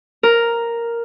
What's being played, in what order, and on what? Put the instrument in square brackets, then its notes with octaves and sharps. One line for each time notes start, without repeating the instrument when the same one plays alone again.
[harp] A#4